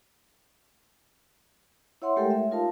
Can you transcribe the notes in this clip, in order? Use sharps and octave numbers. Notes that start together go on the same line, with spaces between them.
E4 C#5 E5 F#5 C6
G#3 A3 G4 A4 A#4 G5
E5
D#4 F4 A#4 F5 A5